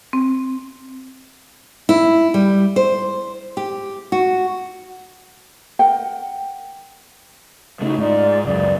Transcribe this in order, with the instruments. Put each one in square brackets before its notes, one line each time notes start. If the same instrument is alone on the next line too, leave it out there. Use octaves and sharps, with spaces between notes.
[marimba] C4
[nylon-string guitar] E4
G3
C5
G4
F#4
[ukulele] A#4 F#5 G5
[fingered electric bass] C#3 A3 [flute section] D#4 E4 F#4
[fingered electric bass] G#2 [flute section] D#4 F4 D5
[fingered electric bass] C#2 F#2 [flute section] D5